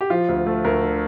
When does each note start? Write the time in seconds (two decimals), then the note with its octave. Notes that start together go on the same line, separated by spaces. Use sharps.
0.01 G4
0.10 F3 F4
0.29 D2
0.46 A3
0.64 D2 A#4
0.83 D3